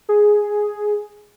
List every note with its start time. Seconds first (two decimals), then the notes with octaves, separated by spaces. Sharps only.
0.09 G#4